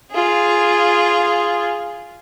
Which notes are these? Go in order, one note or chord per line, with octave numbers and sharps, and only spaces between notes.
F4 G#4